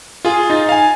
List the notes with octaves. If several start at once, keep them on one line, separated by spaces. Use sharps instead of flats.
F4 G#4
D#4 A6
F5 G#5